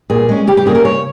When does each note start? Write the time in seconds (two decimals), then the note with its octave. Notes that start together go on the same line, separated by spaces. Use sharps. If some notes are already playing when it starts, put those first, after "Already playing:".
0.10 A#2 G#4
0.29 G#3 C#4
0.47 C#3 G4
0.57 G4
0.65 G3 A#3 C#4 G#4
0.75 A#4
0.85 C#3 C#5